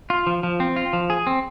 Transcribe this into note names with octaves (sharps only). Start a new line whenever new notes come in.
F4
F3
F3
C4
F4
F3
G#4
C4